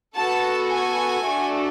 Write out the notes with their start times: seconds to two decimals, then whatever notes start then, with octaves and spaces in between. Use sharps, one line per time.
0.16 B3 F#4 A4 A5
0.70 G#5
1.24 A3 D4 F#4 A4